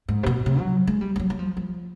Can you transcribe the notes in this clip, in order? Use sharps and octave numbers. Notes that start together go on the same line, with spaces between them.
G#2
C3
B2
C3
F#3
G#3
G3
G3
F#3
F#3
F3
F3